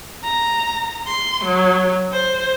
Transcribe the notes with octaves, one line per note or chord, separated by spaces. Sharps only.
A#5
C6
F#3
C5